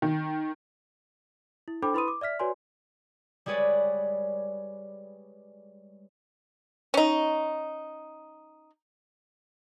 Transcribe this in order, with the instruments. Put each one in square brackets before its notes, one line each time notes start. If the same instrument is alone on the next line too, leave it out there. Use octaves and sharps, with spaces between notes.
[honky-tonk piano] D#3
[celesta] E4
D4 A4 C5 G5 B5 D6
E4 B4 B5 C6 D#6 D#7
D6
D5 E5 F6 B6
F#4 B4 C#5 D5 G#5 C6
[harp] G3 G#3 G#4 B4 C#5 D5
[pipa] C#4 D#4